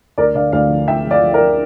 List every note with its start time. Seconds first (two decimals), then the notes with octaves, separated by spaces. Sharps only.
0.18 D2 A#4 D5
0.35 D3 D5 F5
0.53 D2 D5 F5
0.70 F3
0.88 D2 E5 G5
1.05 F3
1.10 D5 F5
1.22 F3
1.34 A#4 D5
1.40 F3